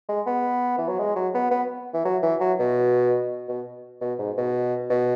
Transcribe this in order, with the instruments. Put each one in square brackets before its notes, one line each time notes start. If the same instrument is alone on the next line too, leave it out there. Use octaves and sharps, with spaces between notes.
[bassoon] G#3
B3
E3
F#3
G#3
F#3
B3
B3
E3
F#3
E3
F#3
B2
B2
B2
G#2
B2
B2